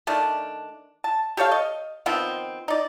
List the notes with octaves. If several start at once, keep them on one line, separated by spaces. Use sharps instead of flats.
D#3 A3 D4
A5
G4 A4 C#5 F5
D#5
D#3 F3 B3 C4
D#4 D5